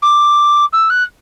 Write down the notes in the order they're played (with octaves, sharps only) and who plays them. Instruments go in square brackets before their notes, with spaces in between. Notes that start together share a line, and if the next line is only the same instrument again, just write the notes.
[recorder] D6
E6
F#6